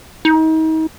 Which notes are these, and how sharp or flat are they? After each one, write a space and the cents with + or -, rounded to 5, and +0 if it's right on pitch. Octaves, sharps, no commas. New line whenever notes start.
D#4 +35